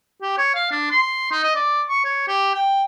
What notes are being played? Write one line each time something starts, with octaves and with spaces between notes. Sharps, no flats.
G4
C#5
F5
D4
C6
D#4
D#5
D5
C#6
C#5
G4
G5